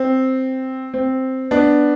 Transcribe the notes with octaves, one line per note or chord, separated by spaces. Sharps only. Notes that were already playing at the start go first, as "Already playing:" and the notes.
Already playing: C4
C4
B3 D4